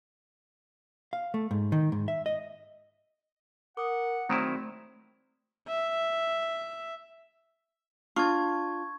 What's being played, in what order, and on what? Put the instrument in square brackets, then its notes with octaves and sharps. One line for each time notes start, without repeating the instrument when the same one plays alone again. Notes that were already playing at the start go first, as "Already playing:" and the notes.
[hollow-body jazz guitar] F5
A3
G#2
D#3
G#2
E5
D#5
[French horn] A#4 [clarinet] F#5 [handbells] D6 D#6
[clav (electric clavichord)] D#3 F#3 E4 [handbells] A3 A#5 C6 [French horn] C4
[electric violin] E5
[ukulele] D4 F4 [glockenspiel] C#6 G#6